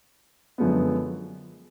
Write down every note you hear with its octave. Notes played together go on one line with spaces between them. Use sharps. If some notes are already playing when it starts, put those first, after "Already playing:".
F#2 D3 F3 G#3 B3